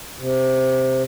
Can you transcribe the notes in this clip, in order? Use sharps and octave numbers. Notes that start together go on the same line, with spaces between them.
C3